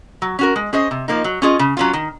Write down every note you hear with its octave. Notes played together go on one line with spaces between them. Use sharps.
F#3
C#4 F#4 A#4
G#3
C#4 G#4 C5 D#5
C3
F3 A#3 D#4
F#3
C#4 F4 G#4 D#5
C#3
F#3 C#4 F4
D#3